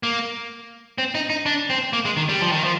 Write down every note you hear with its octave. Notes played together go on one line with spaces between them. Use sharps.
A#3
C4
D#4
D#4
D4
C4
A#3
G#3
D#3
G3
F3
D#3
F3